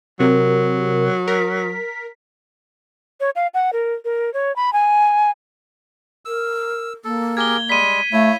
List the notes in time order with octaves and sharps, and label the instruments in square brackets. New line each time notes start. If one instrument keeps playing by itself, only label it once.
[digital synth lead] C3 [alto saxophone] F#3 [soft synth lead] A#4
[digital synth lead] A#4 [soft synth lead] B6
[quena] C#5
F5
F#5
A#4
A#4
C#5
B5
G#5
[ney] A#4 [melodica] E6
[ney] A#3 [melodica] A4
[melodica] G4 G#4 A#4 [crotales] G#6 G7
[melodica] G3 G#3 [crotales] B6 D#7
[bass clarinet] A3 [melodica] E4 C#5 [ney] F5